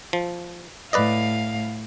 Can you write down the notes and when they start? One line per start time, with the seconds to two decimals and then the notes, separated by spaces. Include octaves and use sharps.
0.13 F3
0.93 A2 B4 D5 D#5 F5